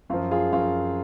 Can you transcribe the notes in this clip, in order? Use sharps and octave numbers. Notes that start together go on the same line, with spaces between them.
F#2 F3 F4
F4 G#4
F#2 F3 F4